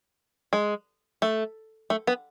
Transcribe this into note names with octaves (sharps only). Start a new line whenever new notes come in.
G#3
A3
A3
B3